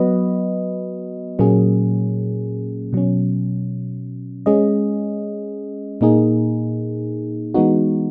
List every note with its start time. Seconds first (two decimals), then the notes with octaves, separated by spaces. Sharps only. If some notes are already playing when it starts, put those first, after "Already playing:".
Already playing: F#3 B3 F#4 B4 D#5
1.39 A#2 F#3 A#3 C#4 G#4
2.93 B2 F#3 C#4
4.46 G#3 C#4 G#4 D#5
6.01 A#2 A#3 D#4 G#4
7.54 E3 G#3 B3 D#4 F#4